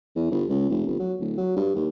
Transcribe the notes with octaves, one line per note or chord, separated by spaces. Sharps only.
E2
G1
C#2
F1
G1
F#3
D1
F#3
G2
D#2